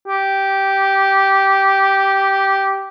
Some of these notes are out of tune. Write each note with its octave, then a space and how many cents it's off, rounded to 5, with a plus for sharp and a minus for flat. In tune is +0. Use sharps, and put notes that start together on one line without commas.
G4 -10